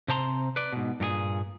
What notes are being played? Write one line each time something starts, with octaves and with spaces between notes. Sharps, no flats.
C3 C4 C5 A5 A#5 C6
B4 D5
G#2 B2
G2 A#2 G4 G#4